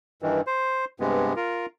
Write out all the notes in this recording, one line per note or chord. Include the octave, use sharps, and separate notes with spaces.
G2 D#3 E3
C5
G2 C3 G#3 B3
F4 A#4